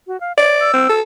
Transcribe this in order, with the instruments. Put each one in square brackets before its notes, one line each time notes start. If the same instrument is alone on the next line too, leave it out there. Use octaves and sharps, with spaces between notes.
[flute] F#4
F5
[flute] C#5 [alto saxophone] D5
[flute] E6
[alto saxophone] C4
A4